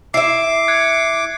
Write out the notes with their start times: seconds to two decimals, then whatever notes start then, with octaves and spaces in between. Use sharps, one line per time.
0.14 E4 E5 D6 C7
0.68 F#6 G#6 C#7